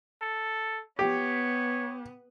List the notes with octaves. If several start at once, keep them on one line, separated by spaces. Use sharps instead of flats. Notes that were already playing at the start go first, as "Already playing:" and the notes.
A4
B3 G4 C#5